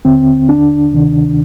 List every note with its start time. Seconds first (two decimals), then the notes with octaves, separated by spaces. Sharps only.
0.05 D#2 D3 C4
0.49 D4
0.92 D2 C3 D#3